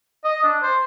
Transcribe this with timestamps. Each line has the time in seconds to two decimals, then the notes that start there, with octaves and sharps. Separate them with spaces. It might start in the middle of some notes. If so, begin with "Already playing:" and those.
0.24 D#5
0.43 D4
0.62 C5